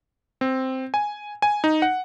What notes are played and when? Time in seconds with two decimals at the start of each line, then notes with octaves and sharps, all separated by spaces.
0.41 C4
0.94 G#5
1.42 G#5
1.64 D#4
1.82 F#5